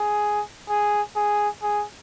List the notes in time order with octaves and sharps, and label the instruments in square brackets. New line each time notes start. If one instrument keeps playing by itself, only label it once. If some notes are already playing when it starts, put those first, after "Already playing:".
Already playing: [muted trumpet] G#4
G#4
G#4
G#4